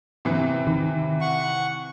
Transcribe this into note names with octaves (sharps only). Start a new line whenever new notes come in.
C3 E3
D#3
F#5 C#6